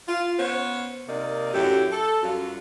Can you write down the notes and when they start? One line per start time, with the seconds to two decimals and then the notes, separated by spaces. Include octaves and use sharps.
0.07 F4
0.38 B3 C#4 C5 C#5
1.08 C3 A#3 D#4 A#4 D5
1.53 F#2 A2 E4 G4
1.91 A4
2.22 F#2 G3 F4 F#4